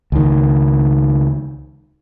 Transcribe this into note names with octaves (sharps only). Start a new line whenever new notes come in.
C#2 D#3